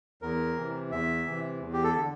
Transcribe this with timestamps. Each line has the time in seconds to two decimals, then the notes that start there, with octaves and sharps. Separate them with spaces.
0.22 E2 A#4
0.56 C3 E3
0.91 E2 E5
1.26 C3 E3
1.60 E2
1.73 G4
1.84 A4
1.95 D3